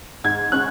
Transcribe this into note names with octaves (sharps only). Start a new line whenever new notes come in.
G#2 G#6
C#4 F#6